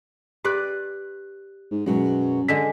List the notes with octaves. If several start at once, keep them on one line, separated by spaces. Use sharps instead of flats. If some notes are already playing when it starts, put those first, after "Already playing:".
G4 B4 D5 F#6
G#2
F#2 B2 F#3 G#3
D3 G#3 B6